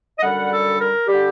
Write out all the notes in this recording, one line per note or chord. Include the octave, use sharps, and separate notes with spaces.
D#5
F#2 D3 G3 F#5
A4
A#4
D3 G3 G4